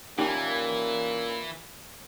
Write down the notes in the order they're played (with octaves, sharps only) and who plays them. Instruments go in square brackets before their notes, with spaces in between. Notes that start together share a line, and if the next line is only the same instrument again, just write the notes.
[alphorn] A#2 [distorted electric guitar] E3 [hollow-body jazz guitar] A#3 C#4 G4 [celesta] D#4